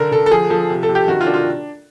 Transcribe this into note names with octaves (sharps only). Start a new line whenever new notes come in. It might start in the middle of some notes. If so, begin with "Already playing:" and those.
Already playing: D3 D4 A#4
D3 A4
A4
F3 G#4
F3 A4
C3
A4
C3
G4
D#3 F#4
F4
D4
F4